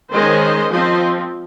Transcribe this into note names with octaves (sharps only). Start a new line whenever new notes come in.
D#3 G#3 C#4 C5 D#5
F3 C4 C5 D#5